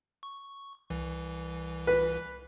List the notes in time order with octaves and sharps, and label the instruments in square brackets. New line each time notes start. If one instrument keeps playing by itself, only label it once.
[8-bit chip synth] C#6
C2 E3
[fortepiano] B4